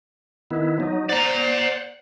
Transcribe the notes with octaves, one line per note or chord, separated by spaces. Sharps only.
D#3 B3 E4
F#3 D#4
C5 D5 F#5 A#5